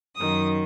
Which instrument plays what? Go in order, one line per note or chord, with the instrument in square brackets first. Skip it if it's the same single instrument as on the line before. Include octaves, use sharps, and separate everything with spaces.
[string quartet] F#2 D#3 D#6